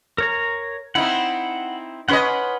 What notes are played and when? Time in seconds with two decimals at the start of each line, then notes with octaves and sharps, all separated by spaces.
0.18 A#4 C#5 A#5
0.95 C4 D#4 E4 F#5 B5
2.08 C#4 B4 D#5 F#5 C6